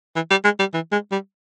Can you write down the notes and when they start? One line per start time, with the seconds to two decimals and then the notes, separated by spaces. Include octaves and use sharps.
0.16 E3
0.31 G3
0.45 G#3
0.60 G3
0.74 E3
0.92 G#3
1.12 G3